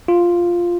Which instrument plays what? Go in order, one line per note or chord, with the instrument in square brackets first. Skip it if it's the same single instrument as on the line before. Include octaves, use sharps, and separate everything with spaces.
[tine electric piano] F4